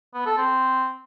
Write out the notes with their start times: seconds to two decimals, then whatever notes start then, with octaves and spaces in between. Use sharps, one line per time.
0.14 B3
0.26 A4
0.38 C4